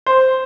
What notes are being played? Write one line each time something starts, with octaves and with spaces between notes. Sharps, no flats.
C5